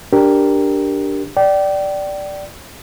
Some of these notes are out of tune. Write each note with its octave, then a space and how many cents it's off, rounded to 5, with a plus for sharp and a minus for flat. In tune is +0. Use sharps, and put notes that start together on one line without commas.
D4 +0 G4 +0 A#4 +0
D5 +0 G5 -30